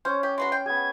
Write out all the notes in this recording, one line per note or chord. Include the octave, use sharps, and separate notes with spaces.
C#4 C5
G4
G#3 B3 F#4 C6
G5
B3 G#4 G#6